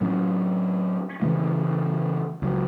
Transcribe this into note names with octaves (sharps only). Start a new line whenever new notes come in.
A2 F#3 C#4
C#3 E3 A3
C#2 C#3 F#3